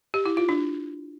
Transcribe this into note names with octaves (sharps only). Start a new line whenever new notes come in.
G4
E4
F4
D4